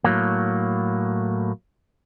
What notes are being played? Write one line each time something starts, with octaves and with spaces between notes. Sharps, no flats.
A2 F#3 A#3